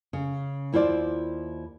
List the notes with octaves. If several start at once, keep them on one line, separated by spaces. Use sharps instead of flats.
C#3
D#2 E4 F4 C5 D5